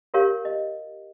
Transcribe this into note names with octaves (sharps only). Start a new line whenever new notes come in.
F4 G4 A#4 C#5 F5
D#5